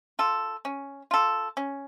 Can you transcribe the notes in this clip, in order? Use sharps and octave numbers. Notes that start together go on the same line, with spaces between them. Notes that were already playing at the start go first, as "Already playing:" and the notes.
F4 A4
C#4
F4 A4
C#4